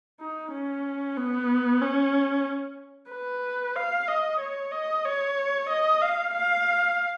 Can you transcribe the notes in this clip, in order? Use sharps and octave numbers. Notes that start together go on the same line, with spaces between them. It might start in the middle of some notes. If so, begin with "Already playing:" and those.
D#4
C#4
B3
C#4
B4
F5
D#5
C#5
D#5
C#5
D#5
F5
F5